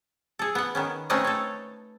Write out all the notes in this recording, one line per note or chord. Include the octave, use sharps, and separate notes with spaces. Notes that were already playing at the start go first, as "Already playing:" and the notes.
G#4 A4
B3 F#5
D#3 B3 C#4
A3 C4 C#4 D#4 B4 D#5
A4 C#5